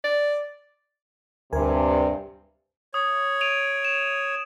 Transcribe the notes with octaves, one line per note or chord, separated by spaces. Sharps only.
D5
D2 G2 C3 A#4 G#5
C#5 D#6
D7 D#7 F7
E7